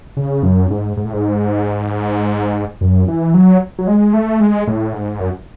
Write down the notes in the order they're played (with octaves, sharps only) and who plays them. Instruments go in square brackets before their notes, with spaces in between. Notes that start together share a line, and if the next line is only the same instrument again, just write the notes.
[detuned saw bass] C#3
F#2
G#2
G#2
A2
G#2
F#2
E3
F#3
F#3
G#3
A3
G#3
A2
G#2
F#2